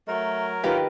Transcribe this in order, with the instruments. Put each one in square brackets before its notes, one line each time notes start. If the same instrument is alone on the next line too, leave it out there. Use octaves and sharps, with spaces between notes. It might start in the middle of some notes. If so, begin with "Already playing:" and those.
[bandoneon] F#3 A#4 [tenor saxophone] A3
[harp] D#3 G4 B4 [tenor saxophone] F4